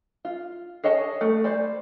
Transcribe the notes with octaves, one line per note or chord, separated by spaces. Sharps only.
F4
G#4 C#5 D#5 A5
A3
C5 D5 B5